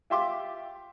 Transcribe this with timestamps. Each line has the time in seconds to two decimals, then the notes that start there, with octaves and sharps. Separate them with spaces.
0.10 F4 G4 E5 F5 C6 D6